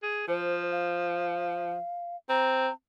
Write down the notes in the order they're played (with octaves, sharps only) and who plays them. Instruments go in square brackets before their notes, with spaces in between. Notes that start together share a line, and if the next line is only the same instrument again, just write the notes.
[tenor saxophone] G#4
[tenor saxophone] F3 [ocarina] C5
[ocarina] F5
[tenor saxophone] C4 [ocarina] A#5